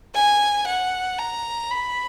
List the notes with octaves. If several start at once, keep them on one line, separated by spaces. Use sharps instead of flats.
G#5
F#5
A#5
B5